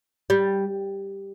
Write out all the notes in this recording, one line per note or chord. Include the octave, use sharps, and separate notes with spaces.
G3